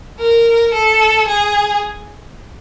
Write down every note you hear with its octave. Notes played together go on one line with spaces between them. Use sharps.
A#4
A4
G#4